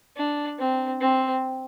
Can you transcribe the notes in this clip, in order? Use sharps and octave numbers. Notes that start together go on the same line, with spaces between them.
D4
C4
C4